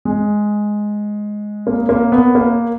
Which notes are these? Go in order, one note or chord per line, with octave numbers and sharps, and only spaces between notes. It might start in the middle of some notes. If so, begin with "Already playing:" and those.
G#3
A#3
A#3
B3
A#3